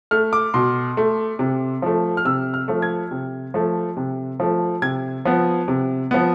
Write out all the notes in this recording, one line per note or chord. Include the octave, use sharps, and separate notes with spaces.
A3 F6
D6
B2 C6
A3
C3
F3 A3
F6
C3 E6
F6
F3 A3
G#6
C3
F3 A3
C3
F3 A3
C3 G#6
F3 B3
C3
F3 B3